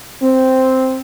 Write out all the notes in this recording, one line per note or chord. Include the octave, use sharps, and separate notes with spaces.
C4